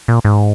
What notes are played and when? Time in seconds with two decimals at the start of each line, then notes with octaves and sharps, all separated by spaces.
0.08 A#2
0.25 G#2